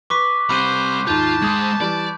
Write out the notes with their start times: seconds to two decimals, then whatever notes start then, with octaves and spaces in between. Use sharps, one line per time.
0.10 B4 C#6 D6 B6
0.49 C3 G3 C5 B5 F#6 D#7
1.07 D#2 G#2 F4 A5 G6
1.42 G#3 C5 D#6 G#6
1.80 E3 G3 D5